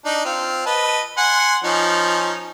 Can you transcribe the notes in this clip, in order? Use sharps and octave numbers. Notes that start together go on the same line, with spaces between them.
D4 D#4
C4 F4
B4 D#5 A5
F#5 G#5 C6
F3 C#4 D#4